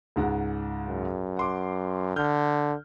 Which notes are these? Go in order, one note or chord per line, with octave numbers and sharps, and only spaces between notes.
C#2 G#2 F#5
F#2
F#5 C6 D6
D3 F6 G6